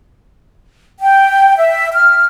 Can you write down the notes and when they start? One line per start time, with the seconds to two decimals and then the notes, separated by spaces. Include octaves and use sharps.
1.00 G5
1.58 E5
1.94 F6